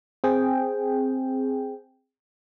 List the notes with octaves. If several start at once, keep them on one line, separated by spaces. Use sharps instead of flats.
C4 G#4 G5